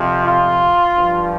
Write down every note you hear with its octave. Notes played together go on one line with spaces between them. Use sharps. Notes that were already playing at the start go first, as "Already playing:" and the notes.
Already playing: F2 C3 F3
F4
G2 F3